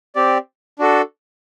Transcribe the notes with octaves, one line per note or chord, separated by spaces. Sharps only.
C4 G4 D5
D4 F#4 A4